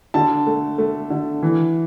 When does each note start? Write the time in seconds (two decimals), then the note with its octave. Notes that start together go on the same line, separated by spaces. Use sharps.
0.14 D3 A5
0.47 A3
0.78 A3
1.10 D3
1.42 E3